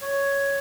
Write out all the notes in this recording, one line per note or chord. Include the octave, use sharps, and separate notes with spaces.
C#5